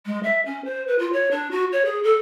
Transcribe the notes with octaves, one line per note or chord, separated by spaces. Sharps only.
G#3
E5
C#4
C5
B4
F4
C#5
D4
F#4
C#5
G#4
A4